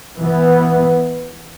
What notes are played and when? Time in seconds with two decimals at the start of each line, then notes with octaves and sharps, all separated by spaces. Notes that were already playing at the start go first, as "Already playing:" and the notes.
0.17 E3 B3